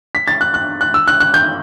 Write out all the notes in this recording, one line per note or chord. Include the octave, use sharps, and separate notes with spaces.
B6
A6
F#6
F#6
F#6
E6
F#6
F#6
G6